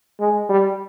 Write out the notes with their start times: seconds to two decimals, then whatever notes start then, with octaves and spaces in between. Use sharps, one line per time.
0.20 G#3
0.49 G3